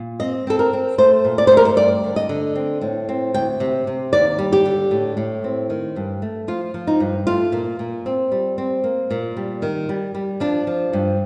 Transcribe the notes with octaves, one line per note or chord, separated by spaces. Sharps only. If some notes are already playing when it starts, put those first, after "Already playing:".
Already playing: A#2
C4 D#5
C4 A4
A#4
C4
A3 C5
A#2
D5
A3 C5
A#4
C5
G2 D5
D3
D#5
D3
C4
A2
C4
D2 G5
C3
C3
D#2 D5
G3
G4
D3
A2
A2
C4
D#3
G2
A3
F3 F4
F3
D#4
G2
A3 F4
A#2
A#2
C4
G3
C4
A#3
A#2
G3
D#3
G3
G3
F3 D4
F3
G2